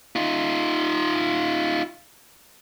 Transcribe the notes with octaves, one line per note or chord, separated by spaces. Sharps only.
D#4 F4